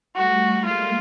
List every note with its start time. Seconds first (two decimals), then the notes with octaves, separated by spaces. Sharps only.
0.15 G3 A3 F#4
0.64 G#3 A#3 F4